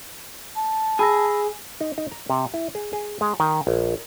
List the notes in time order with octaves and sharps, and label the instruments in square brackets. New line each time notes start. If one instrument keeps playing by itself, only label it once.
[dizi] A5
[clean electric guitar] G#4 [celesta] B5 E6 A#6
[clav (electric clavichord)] D#4
D#4
A#5
C3
E4
G#4
G#4
G#3
D#3
A#1